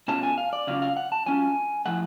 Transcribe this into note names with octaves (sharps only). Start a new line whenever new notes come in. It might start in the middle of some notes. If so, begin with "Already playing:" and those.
B2 A3 C#4 F4 A5
G#5
F5
D5
C#3 F#3 C#4 F4 F5
F5
F#5
A5
F#3 C#4 F4 G#5
A2 F3 A3 F#5